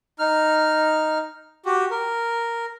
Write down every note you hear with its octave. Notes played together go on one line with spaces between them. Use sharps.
D#4 F6
F#4 G4
A#4